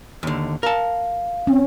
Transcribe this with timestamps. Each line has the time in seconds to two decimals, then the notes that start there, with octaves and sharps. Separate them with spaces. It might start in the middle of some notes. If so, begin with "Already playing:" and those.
0.23 D#2 D3
0.63 A#4 F5 A5
1.47 C4 C#4